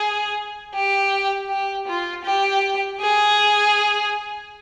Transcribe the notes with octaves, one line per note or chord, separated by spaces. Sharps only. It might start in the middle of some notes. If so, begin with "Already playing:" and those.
Already playing: G#4
G4
G4
F4
G4
G#4